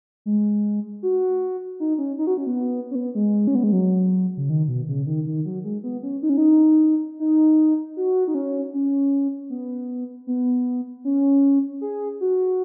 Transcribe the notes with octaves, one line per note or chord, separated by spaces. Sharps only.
G#3
F#4
D#4
C#4
D#4
F#4
C#4
B3
C#4
B3
G#3
C#4
B3
G#3
F#3
C#3
D#3
B2
C#3
D#3
D#3
F#3
G#3
B3
C#4
D#4
C#4
D#4
D#4
F#4
D#4
C#4
C#4
B3
B3
C#4
G#4
F#4